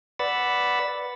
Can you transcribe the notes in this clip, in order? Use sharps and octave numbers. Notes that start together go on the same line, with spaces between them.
B4 D5 F#5 B5 E6 A6